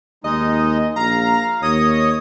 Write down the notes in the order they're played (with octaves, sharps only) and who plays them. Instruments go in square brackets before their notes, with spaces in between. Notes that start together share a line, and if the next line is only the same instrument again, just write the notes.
[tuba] D#2 [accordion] G#3 D#4 [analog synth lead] D#5
[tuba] A#1 [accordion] F5 [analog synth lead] A#5
[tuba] D#2 [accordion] C#5 D#5 [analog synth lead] D#6